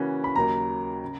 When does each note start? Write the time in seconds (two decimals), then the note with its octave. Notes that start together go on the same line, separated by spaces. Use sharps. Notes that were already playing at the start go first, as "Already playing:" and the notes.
Already playing: C#3 E3 A#3 C#4 F#4
0.24 B5
0.36 D#2 C#3 F#3 A#3 A#5
1.04 C#3